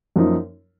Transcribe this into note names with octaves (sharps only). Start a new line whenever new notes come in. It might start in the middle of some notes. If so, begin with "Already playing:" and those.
F#2 F3 A#3 D#4